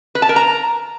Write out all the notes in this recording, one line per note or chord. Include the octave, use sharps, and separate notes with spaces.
B4
A5
A#4
A#5